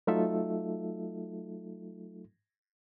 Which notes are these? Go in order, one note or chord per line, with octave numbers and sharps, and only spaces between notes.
F#3 A3 D#4 F4 A4 E5